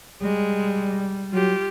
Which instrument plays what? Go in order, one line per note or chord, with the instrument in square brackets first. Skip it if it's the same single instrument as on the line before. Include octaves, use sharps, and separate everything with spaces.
[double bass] G3 [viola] G#3
[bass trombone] F#3 [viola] F4 G4